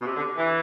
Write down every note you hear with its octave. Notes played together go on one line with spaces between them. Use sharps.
B2
C3
D3
E3